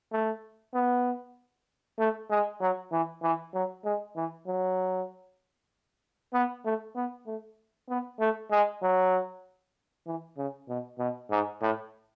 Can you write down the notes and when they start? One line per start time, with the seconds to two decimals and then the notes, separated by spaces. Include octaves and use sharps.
0.12 A3
0.74 B3
1.99 A3
2.30 G#3
2.61 F#3
2.92 E3
3.23 E3
3.54 F#3
3.85 G#3
4.16 E3
4.47 F#3
6.33 B3
6.65 A3
6.96 B3
7.27 A3
7.89 B3
8.20 A3
8.51 G#3
8.82 F#3
10.06 E3
10.37 C#3
10.69 B2
10.99 B2
11.31 G#2
11.61 A2